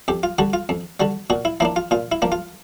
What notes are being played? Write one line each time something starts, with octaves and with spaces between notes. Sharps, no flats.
F2 G4
F4
D3 G3 F#4
F4
F2
D3 G3 F#4
A#2 F#4
E4
F3 A#3 D4 E4
F4
A#2 F4
E4
F3 A#3 D4
F4